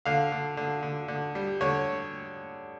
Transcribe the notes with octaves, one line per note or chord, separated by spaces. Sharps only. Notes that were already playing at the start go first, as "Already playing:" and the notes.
D3 F5
D3
D3
D3
D3
G3
D3 C#5